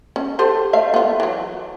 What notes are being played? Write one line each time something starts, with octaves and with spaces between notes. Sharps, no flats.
C#4
G4 A4 C5
A3 E5 F5
B3 F4
E3 F#3